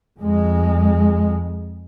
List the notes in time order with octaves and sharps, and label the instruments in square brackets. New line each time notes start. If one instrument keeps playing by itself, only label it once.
[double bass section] F2 G#3